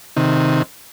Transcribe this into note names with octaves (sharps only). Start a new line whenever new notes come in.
C3 D#3